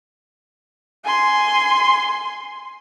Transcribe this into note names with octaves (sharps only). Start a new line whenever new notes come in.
G#5 C6